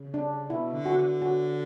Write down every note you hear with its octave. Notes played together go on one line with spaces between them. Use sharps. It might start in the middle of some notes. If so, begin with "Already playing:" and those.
Already playing: C#3
D4
B2 E4
D3
F#4
D3
F#4